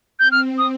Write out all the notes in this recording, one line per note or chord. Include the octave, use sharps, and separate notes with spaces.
C4 G6
F6
D#6